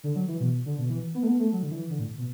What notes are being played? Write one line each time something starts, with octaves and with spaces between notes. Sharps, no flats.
D3
F#3
E3
B2
D3
B2
E3
B3
A3
B3
A3
F#3
D3
E3
D3
A2
B2